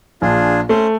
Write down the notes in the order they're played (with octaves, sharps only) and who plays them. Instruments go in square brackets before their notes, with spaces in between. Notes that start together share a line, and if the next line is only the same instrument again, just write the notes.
[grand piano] A#1 [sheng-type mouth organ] D4 F4 G#4
[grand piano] A3 [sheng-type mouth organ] C#4 C5